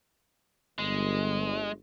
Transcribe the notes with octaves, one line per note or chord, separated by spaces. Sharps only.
G1 G#3